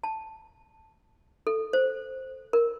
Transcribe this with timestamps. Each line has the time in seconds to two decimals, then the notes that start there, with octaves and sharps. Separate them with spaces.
0.04 A5
1.47 A4
1.73 C5
2.53 A#4